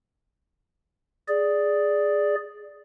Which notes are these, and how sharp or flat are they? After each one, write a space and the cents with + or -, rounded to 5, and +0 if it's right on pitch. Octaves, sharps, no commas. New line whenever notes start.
G#4 +0 D5 +0